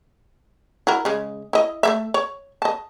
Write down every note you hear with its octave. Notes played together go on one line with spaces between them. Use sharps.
E4 F#4 A#4
C#3 G#3
E4 D#5
A3 A#3 E5
C#5
D#5 A5